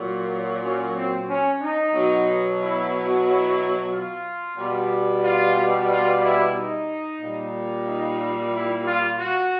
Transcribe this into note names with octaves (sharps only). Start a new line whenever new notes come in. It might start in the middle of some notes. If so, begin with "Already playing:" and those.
Already playing: A#2 F#3
C#4
C4
C#4
D#4
B2 F#3
E4
E4
F4
B2 G3
F4
F4
E4
D#4
A#2 G3
D#4
E4
F4
F#4